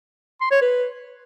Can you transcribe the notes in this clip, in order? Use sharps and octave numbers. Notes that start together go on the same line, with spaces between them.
C6
C#5
B4